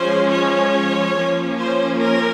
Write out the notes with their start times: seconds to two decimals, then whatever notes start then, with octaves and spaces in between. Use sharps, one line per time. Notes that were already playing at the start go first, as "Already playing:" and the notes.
Already playing: F3 G#3 C#4 C5
0.31 C#5
1.16 F3 A#3 C#4
1.59 C5
2.00 A#4